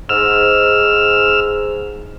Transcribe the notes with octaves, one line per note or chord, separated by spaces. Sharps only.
G#2 E6 F6